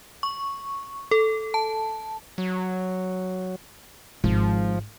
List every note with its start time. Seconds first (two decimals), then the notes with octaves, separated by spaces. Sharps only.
0.23 C#6
1.11 A4
1.54 A5
2.38 F#3
4.24 G#1 F3